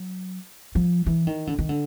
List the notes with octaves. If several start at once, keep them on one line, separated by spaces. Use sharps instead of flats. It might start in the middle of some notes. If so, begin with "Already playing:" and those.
Already playing: F#3
F3
E3
D#3
D3
D#3
D3